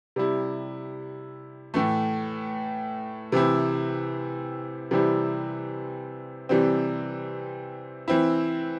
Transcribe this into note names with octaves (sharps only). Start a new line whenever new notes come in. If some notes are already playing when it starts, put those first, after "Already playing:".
C3 G3 E4
A2 E3 A3
C3 E3 C4 E4
C3 E3 G3 C4 E4
C3 E3 G3 C4
E3 C4 E4